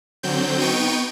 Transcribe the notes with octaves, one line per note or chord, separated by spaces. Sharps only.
D3 F#3 C4 G6
B3 D#4 G5 C#6 D#7